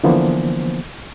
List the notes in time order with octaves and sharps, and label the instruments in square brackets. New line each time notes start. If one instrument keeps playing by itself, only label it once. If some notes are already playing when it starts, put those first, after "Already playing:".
[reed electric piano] D3 E3 F3 A#3 B3 C5